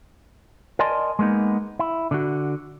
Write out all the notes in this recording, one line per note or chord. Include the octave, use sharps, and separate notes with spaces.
A#4 D5 D#5 G#5 A5 C6
G#3 A#3 B3 D#4
E4
D3 F#4